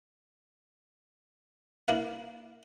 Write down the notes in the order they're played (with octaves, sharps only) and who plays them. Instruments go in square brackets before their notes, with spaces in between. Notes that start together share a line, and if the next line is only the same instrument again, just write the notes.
[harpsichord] A#3 D4 E4 B4 F5